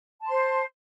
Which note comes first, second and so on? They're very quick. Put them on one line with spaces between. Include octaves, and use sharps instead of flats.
A5 C6 C5